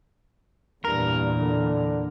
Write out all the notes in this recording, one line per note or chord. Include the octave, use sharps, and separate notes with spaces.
E2 G2 A#2 A#4
D3